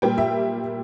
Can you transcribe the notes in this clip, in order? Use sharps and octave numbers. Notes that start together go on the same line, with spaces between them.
A#2 G3 A#3 G5
E5